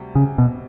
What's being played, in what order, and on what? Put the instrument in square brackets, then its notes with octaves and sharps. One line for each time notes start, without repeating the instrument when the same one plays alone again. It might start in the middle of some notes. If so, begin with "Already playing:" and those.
Already playing: [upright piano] D2 C3 G3
[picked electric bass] C#3
B2